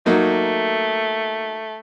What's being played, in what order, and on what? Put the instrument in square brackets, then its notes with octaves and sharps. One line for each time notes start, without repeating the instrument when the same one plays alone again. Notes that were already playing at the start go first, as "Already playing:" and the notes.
[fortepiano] F#3 A#3 D#4 [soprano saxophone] A3